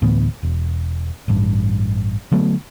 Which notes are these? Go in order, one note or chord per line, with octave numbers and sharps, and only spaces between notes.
D2 A2 E3 B3
E1
A1 G2
D3 F#3 A3 B3